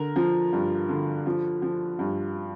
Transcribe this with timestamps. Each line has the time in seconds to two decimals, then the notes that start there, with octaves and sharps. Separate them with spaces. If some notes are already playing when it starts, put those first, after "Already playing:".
Already playing: D3 A#4
0.16 F3
0.53 G2
0.89 D3
1.26 F3
1.62 F3
1.99 G2